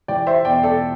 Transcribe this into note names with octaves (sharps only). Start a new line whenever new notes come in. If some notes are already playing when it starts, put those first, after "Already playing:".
E3 D5 G5
C5 E5
E2 D5 G5
A4 D5